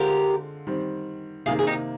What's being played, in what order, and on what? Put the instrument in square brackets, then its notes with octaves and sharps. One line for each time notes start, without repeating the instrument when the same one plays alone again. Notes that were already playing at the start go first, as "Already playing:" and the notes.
Already playing: [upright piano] D3 G#3 C4 F4 [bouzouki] G4 A#4
[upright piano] D#3 G3 C4
[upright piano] C3 D#3 A#3 [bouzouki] F4 G#4
[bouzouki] G#4
D#4 G4